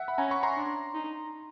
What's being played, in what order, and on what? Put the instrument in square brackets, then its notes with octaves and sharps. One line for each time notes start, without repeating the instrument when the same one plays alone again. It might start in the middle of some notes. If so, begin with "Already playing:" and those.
Already playing: [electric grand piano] E5 F#5
B5
[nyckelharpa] C#4 [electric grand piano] G#5 A#5
[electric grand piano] B5 C#6
A#5 C6
[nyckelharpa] D4
D#4